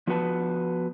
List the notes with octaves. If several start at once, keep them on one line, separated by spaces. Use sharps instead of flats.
F3 B3 F#4 B4 A5